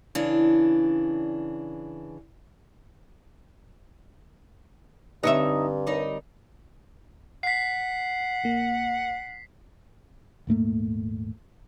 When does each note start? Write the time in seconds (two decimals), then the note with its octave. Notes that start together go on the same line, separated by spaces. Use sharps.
0.15 C#3 E3 D4
5.23 G2 D3 C4 D#4 C#5 E5
5.87 G3 D#4 A#4 C#5
7.43 F#5 B6 C7
8.44 A#1 A#3
10.47 D#1 G#2 A3 A#3